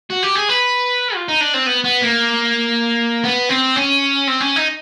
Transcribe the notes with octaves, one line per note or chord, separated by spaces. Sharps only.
F#4
G4
G#4
B4
F4
D#4
D4
C4
B3
B3
A#3
B3
C4
C#4
C4
C#4
D#4